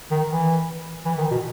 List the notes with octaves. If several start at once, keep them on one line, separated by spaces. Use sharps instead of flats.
D#3
E3
E3
D#3
B2